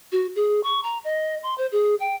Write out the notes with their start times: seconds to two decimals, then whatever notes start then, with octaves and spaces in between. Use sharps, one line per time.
0.12 F#4
0.36 G#4
0.64 C#6
0.84 A#5
1.04 D#5
1.43 C6
1.58 C5
1.72 G#4
2.00 G5